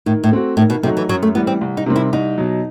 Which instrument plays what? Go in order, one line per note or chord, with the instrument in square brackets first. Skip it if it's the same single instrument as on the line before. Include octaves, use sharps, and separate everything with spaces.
[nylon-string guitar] A2 [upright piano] D#3
[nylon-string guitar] A2
[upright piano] A3 C4 F#4
[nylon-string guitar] A2 [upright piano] D#3
[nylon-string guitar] B2
[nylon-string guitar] C3 [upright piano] F#3 A3 D#4 F#4
[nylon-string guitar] E3
[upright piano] F#2 [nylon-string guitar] F#3
[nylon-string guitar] A3
[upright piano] E3 G3 [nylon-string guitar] B3
[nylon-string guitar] C4
[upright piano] C2
[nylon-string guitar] D#4
[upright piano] C3 D#3 G3 C4
[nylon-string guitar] E4
[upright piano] C2 [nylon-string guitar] D#4
[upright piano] B2 F#3